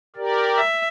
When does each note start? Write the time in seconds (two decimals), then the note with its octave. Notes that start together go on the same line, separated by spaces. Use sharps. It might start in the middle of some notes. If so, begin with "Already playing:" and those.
0.16 G4 A#4 D5
0.58 E5